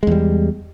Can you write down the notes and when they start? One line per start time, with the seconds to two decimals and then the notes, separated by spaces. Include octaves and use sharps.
0.03 G#3
0.07 E2
0.12 G3